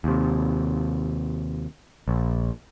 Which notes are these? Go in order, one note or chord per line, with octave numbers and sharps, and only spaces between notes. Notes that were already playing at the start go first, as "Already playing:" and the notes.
D#2 C3
A#1